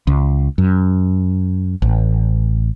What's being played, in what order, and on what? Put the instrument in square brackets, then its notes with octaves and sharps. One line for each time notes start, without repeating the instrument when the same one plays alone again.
[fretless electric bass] C#2
F#2
A1